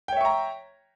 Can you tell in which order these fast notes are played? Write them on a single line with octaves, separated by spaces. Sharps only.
G5 C#5 E5 C#6 A#5